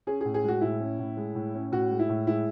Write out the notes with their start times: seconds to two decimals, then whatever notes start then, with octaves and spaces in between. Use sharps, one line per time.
0.07 C#4 G#4
0.21 A2 G#4
0.34 G#4
0.44 G#3 F#4
0.61 A2 E4
0.80 C#4
0.99 A2
1.17 G#3
1.35 A2
1.54 C#4
1.72 A2 F#4
1.91 G#3
1.99 E4
2.09 A2
2.27 G#3 E4